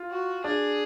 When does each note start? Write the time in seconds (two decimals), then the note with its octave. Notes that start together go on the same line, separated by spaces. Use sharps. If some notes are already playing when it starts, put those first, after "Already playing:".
Already playing: F4
0.11 F#4
0.44 D4 G#4